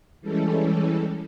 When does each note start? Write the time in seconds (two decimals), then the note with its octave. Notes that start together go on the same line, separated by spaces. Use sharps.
0.21 E3 G3 G#3 C#4 A4